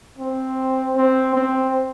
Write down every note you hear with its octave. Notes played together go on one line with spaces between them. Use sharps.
C4
C4
C4